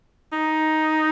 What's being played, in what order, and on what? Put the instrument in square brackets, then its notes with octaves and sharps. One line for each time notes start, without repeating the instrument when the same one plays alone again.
[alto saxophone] D#4